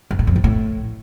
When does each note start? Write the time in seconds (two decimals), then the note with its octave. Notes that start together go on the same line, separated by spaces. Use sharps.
0.11 G2
0.19 A2
0.27 F2
0.36 G#2
0.44 A2